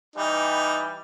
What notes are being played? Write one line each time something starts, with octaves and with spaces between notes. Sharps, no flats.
E3 G3 D#4